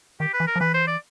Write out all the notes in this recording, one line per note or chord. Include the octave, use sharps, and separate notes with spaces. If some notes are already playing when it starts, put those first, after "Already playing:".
D#3 G4
B4
E3
A#4
F3
E3 B4
C5
D5